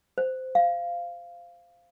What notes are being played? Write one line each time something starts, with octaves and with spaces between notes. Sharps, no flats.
C5
F5